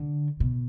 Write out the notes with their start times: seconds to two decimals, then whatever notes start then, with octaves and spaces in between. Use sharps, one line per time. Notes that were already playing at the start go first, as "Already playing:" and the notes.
Already playing: D3
0.40 B2